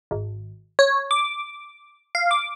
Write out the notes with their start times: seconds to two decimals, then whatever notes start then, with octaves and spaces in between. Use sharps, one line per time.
0.11 G#1
0.79 C#5
1.11 D6
2.15 F5
2.31 D6